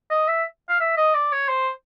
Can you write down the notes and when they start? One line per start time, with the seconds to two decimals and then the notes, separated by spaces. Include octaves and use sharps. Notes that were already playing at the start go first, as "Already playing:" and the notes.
0.11 D#5
0.28 E5
0.69 F5
0.80 E5
0.97 D#5
1.15 D5
1.32 C#5
1.49 C5